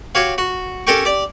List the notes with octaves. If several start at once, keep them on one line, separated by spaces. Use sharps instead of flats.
F#4 G4 C#5 F5
F#4
C#4 G4 A4 A#4 G5 C#6
G4 D5